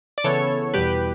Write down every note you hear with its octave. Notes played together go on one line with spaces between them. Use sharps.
D5
C#3 E3 B3 A4 C#5
E2 B2 G3 G4 B4